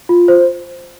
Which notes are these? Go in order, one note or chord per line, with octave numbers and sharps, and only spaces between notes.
F4
C5